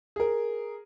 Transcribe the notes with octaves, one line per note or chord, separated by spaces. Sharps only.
G#4 A#4